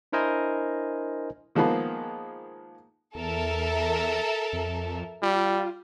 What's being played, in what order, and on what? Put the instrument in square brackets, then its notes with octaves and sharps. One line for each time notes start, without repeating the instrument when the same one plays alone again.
[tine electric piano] D4 E4 A#4 C5 D#5 G#5
[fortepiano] D#3 F3 G#3 A#3 B3
[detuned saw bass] E2 [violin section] A4 A#4 E5
[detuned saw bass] F2
[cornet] G3 [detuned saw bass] F4